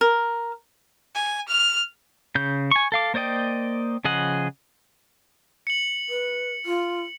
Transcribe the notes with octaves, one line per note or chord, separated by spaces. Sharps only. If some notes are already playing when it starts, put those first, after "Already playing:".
A#4
G#5
F6
C#3 G6
G#5 C#6
A4 F5 D6
A#3 C5 D5 D#5 G5
C#3 F3 G#4 D#5 F#5
C#7 F#7
B4
F4